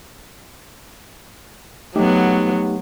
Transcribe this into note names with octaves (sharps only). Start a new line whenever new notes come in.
F#3 A3 B3 D#4 G4